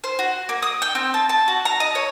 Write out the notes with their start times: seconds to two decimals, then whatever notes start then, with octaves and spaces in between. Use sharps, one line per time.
0.04 C5
0.19 F#4
0.49 A#3
0.62 D#6
0.82 G5
0.95 C4
1.14 A5
1.29 A5
1.48 F#4
1.65 A#5
1.80 D#5
1.95 C#5